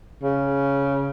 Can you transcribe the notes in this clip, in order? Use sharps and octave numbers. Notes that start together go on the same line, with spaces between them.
C#3